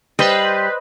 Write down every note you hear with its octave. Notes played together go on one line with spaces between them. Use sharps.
G3 B4 C5 D#5